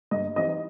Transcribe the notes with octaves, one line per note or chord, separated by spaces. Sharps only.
G2 D#5
E3 G3 C4 D#4 D#5